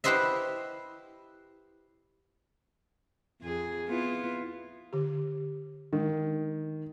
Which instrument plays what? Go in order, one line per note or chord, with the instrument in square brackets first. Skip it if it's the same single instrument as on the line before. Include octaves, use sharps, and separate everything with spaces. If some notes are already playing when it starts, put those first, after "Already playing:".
[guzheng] E4 G4 B4 C5 D#5 E5
[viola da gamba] F2 G#4
B3 E4 F4
[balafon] D3 G4
[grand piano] D#3 [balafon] G#3